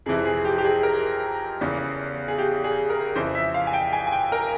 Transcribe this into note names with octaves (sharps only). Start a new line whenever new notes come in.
F2 C3 E3 G#4
G#4
G4
G4
G#4
A#4
E2 C#3 E3
G#4
G4
G#4
A#4
F2 C#3 E3 C5
E5
F5
G#5
G5
G#5
G#5
G5
A#4